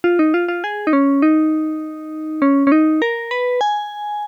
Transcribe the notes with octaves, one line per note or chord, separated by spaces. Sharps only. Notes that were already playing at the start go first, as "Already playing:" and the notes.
F4
D#4
F4
F4
G#4
D#4
C#4
D#4
C#4
C#4
D#4
A#4
B4
G#5